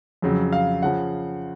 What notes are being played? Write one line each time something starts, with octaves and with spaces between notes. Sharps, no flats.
F2 C#3 F#3
F5
C#3 F3 F#5